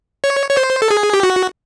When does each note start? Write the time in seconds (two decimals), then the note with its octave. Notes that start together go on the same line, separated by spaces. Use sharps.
0.24 C#5
0.50 C#5
0.57 C5
0.82 A4
0.91 G#4
1.13 G4
1.23 F#4